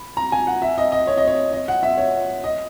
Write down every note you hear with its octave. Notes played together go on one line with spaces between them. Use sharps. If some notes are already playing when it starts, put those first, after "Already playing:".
Already playing: B5
A#5
G#5
F#5
E5
D#5
D#5
C#5
D#5
C#5
D#5
F#5
E5
C#5
D#5